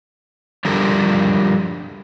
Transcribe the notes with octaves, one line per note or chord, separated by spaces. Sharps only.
F3 G3 D4 G4 A4 A#4